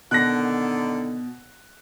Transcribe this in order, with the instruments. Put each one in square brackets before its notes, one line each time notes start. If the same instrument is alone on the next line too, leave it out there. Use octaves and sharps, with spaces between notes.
[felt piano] B2 [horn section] D3 D#3 [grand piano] F#6 A#6